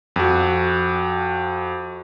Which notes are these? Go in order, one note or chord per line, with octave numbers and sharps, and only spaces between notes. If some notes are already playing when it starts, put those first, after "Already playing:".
F2 F#4